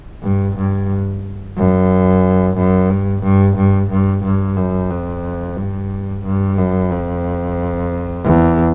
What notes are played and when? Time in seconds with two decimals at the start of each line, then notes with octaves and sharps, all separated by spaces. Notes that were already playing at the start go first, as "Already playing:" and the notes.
0.22 G2
0.56 G2
1.56 F#2
2.57 F#2
2.90 G2
3.23 G2
3.57 G2
3.90 G2
4.24 G2
4.57 F#2
4.90 F2
5.57 G2
6.24 G2
6.57 F#2
6.91 F2
8.24 E2